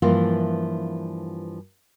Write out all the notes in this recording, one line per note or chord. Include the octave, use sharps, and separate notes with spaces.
G2 E3 F3 A#3 E4 F4